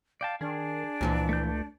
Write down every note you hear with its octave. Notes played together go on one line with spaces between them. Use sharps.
D5 F5 G5 A5
D#3 D4 G#4
C#2 A#2 E3 F3
A3 G6